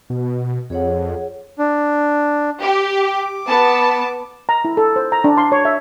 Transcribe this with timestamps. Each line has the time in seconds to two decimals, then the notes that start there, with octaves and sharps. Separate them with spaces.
0.10 B2
0.70 F2 G#4 C#5 F#5
1.59 D4
2.63 G4 D6
3.48 B3 A5
4.49 A#5
4.65 E4
4.77 A4
4.96 C5
5.12 A#5
5.24 D4
5.37 C6
5.52 C#5
5.65 E5